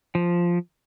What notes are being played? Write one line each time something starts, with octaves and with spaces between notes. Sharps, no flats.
F3